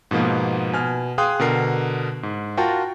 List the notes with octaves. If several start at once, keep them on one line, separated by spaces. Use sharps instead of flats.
G#2 B2 F3 A#3 B3
B2 G#5 F6
G#4 F5 G5 C6 D#6 F#6
B2 D3 A#4 C7
G#2
F4 F#4 A#4 G5 A5